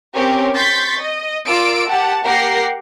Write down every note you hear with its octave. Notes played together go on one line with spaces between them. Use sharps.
C4 C#4 G4 A#4 C#5
C6 C#6 G6 A6 B6
D#5
F4 A#4 D5 D6 E6 D7
G4 F#5 A5
A#3 G4 A#4 F#5 A#6 C7